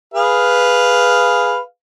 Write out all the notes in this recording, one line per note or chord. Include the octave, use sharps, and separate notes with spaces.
G#4 B4 F5